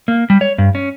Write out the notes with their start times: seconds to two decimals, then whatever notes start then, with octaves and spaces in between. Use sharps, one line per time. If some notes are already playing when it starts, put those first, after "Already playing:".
0.08 A#3
0.30 G3
0.41 C#5
0.58 G2
0.75 C#4